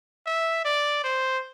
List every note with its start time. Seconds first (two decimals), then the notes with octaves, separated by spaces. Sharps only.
0.26 E5
0.65 D5
1.04 C5